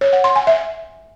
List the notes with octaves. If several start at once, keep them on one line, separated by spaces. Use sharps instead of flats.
C#5
F#5
C6
G#5
E5